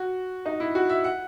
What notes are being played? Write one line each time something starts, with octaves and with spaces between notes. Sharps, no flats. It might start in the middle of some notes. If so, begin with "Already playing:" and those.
Already playing: F#4
D#4
E4
F#4
E5
F#5